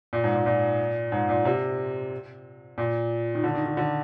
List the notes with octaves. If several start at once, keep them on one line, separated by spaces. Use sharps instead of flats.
A#2
G#2
A#2
A#2
G#2
A#2
C3
A#2
D#3
D3
D#3
D#3
D3